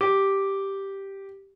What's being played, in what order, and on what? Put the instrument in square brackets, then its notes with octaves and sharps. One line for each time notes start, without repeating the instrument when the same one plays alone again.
[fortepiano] G4